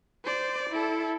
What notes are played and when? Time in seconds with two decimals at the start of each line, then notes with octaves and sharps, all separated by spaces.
0.25 C5 D5
0.70 E4 A4